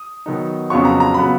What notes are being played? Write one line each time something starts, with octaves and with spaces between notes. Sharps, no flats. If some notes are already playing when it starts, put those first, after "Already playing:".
Already playing: D#6
D#3 F#3 B3 D#4
F2 C#3 F#3 B3 F4 C#6
A#5
A#5
C#3 F#3 B3 F4 B5